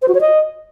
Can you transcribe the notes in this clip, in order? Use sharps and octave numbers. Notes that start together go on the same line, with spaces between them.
C5
F#4
C#5
D#5